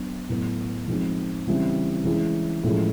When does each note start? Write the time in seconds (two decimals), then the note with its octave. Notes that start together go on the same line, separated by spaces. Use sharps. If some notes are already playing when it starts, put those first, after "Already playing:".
Already playing: F#3 B3 D4
0.29 A2 F#3 B3
0.88 F3 G#3 C4 D#4
1.47 C#3 E3 G3 C4 E4
2.05 E3 G#3 C#4 E4
2.63 A2 F3 G#3 C#4